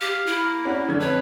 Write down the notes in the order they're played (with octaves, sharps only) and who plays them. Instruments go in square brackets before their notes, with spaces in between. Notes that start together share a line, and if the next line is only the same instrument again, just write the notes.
[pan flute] G4 [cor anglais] F5
[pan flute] E4
[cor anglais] A#3
[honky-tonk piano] C#4 F#4 D5
D3 G#6
[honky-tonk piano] F2 C#4 [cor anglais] B4 [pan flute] C#5